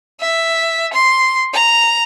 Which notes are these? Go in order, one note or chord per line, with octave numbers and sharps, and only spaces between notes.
E5
C6
A#5